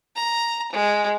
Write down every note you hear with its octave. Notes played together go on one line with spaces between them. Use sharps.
A#5
G#3